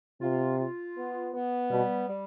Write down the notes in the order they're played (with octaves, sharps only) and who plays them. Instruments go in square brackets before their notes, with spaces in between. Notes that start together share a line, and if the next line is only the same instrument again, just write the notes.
[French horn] C3 [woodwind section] F4
[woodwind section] F4
B3
B3
[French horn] B2 [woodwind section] G3
[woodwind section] G3